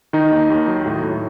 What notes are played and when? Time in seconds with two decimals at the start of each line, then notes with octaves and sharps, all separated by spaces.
0.13 D#3 D#4
0.31 D#2
0.50 D#2
0.68 F#3
0.86 A2
1.03 A2